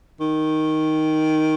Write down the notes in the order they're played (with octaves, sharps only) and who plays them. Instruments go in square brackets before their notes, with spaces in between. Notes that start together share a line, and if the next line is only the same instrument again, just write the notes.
[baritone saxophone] D#3